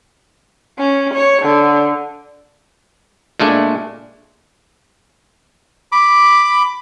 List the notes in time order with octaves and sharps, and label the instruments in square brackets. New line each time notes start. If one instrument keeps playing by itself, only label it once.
[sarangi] C#4
C#5
D3
[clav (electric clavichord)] A#2 G#3 A3 D4
[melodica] B5 D6